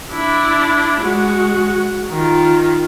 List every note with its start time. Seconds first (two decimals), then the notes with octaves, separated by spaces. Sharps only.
0.12 D4 E4
1.02 G#3 F#4
2.10 D#3 F4